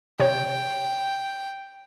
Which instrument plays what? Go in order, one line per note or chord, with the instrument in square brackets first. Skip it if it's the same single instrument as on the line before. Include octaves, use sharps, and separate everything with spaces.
[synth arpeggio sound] C3 C#5 [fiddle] G5